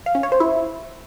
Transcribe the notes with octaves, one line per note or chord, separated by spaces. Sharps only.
F5
C#4
C#5
C5
E4